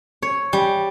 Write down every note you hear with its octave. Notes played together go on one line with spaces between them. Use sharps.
C#5
G3